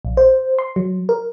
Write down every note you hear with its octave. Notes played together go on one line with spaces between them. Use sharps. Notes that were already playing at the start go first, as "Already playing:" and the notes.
A#1
C5
C6
F#3
A#4